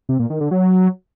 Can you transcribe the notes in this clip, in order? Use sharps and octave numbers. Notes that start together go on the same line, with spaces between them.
C3
A#2
D#3
D3
F#3